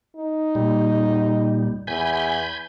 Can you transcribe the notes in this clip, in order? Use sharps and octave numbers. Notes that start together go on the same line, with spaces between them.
D#4
A#2 G3
E2 G#5 B5 G6